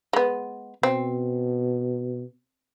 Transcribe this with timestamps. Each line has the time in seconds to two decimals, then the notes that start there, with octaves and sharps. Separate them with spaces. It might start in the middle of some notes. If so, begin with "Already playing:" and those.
0.13 G#3 B3
0.83 B2 C4